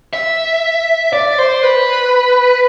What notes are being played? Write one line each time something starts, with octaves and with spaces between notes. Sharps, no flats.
E5
D5
C5
B4